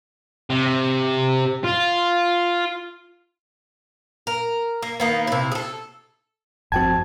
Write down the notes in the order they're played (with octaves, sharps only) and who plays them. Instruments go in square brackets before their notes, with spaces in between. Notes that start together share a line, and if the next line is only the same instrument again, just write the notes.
[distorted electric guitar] C3
F4
[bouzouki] A#4
A#3
D#3 A#3 B3
C3 E4
G#4 A4
[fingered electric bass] G1 F2 C4 [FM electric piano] F#4 G5 G#6 [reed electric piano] A5